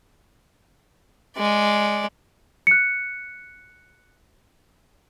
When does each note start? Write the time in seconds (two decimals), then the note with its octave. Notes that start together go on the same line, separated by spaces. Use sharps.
1.37 G#3 D5
2.67 F#6 C#7